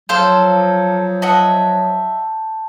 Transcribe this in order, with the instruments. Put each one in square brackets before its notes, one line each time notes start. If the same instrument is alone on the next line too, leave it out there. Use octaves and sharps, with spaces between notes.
[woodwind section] F3 F#3 [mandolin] A4 F5 [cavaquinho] C5 [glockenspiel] G6
[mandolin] D#5 E5 F#5 [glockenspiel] A5